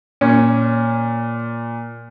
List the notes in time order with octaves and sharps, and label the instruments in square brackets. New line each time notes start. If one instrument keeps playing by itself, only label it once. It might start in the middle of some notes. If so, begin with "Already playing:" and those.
[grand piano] A#2 [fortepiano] C#4